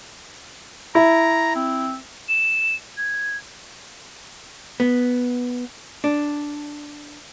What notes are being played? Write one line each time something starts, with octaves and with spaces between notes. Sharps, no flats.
E4 A#5
C4
E7
G#6
B3
D4